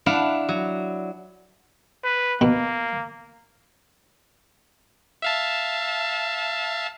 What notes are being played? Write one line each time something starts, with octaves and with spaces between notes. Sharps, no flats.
D4 E4 F5 F#5
F#3
B4
B2 A#3 B3
E5 F5 A5